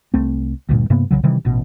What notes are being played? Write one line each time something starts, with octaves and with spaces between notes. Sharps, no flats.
C2 A3 C4
D2 G2 A#2
G2 C3 A#3 B3
B1 F2 C#3 F#3
C3 D#3 E3 G3
A1 B2